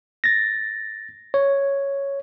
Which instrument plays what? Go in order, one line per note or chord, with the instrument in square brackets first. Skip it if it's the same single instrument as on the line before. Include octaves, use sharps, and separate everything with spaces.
[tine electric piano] A6 A#6
C#5